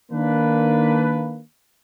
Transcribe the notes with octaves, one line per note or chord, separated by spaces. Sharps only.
D#3 A#3 D4 B4